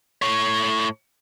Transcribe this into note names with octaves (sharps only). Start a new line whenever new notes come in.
A2 C#5